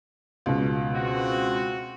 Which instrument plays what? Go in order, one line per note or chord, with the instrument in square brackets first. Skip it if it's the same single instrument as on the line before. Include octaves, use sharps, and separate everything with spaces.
[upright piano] C#2 B2
[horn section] C4 F#4